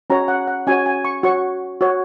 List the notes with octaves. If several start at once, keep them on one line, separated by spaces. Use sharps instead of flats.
C#4 F#4 C#5 A#5
F#5
F#5
C#4 F#4 C#5 G#5
G#5
C#6
F#4 C#5 C#6
F#4 C#5